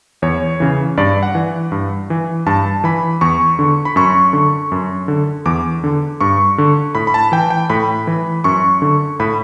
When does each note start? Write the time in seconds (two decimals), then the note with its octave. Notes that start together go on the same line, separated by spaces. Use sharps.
0.22 E2 C#5
0.60 C#3 E3
0.98 G2 D5
1.23 F#5
1.35 E3
1.72 G2
2.10 E3
2.46 G2 A5
2.84 E3 B5
3.21 E2 C#6
3.59 D3
3.85 B5
3.96 F#2 C#6
4.33 D3
4.72 F#2
5.08 D3
5.46 E2 D6
5.84 D3
6.21 G2 C#6
6.58 D3
6.95 A2 B5
7.07 B5
7.14 A5
7.32 E3 G5
7.50 G5
7.70 A2 B5
8.07 E3
8.44 F#2 C#6
8.82 D3
9.20 A2 B5